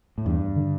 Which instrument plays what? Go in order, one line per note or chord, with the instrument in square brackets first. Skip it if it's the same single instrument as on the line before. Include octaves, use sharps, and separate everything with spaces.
[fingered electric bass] A2
[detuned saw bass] E2 [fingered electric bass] G2
[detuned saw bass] D3